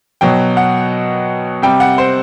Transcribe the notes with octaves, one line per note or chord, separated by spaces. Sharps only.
B2 F#3 G5
F#5
C3 G3 G5
F#5
C5